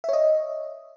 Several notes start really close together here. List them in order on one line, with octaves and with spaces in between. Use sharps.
E5 C#5 D#5